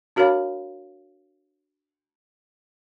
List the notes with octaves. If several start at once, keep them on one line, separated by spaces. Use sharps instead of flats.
D4 F#4 A#4 C#5 F5 B5